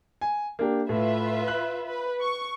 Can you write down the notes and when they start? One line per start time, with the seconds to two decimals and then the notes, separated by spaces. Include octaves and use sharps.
0.21 G#5
0.59 A#3 D4 G4
0.89 A2 F4 B4 E5
1.48 F#6
1.87 B4
2.21 C#6